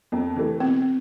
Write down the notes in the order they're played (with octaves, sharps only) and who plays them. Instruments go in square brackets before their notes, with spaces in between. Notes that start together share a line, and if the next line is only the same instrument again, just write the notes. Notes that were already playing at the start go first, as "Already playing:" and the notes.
[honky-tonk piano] F2
E3 A3
[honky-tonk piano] B2 [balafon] C4